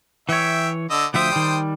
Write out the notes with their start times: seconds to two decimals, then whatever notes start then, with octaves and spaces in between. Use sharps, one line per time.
0.29 E3 C#5 E5 G5
0.90 D3 D#5 E6
1.14 D2 F3 C5 E5 G5 D#6
1.32 D#3 G3